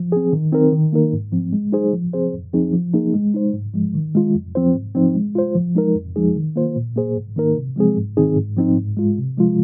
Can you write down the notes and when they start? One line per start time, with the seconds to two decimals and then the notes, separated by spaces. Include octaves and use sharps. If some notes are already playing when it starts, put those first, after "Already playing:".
Already playing: F3
0.12 C4 G#4
0.33 D#3
0.52 C4 D#4 A#4
0.72 D#3
0.93 A#3 D#4 A#4
1.13 G#2
1.32 F3 C4
1.53 G#3
1.72 D#4 G#4 C5
1.93 F3
2.13 C4 G#4 C5
2.33 F2
2.53 F3 C4 D#4 G#4
2.73 F3
2.94 A#3 D#4 G#4
3.14 G#3
3.34 D#4 C5
3.53 G#2
3.74 F3 G#3
3.94 D#3
4.15 G#3 F4
4.35 F2
4.55 F3 C4 F4 C5
4.75 G#2
4.95 F3 C4 D#4 C5
5.15 G#3
5.35 F4 C5
5.55 F3
5.75 G#3 D#4 A#4
5.95 F2
6.16 F3 G#3 D#4 G#4
6.36 D#3
6.56 A#3 F4 C5
6.76 A#2
6.96 A#3 G#4 C5
7.17 G#2
7.36 D#3 A#3 D#4 A#4
7.56 C3
7.76 F3 G#3 C4 G#4
7.97 G#2
8.17 D#3 C4 D#4 G#4
8.36 G#2
8.57 F3 C4 D#4
8.77 G#2
8.97 G#3 F4
9.18 C3
9.37 F3 G#3 F4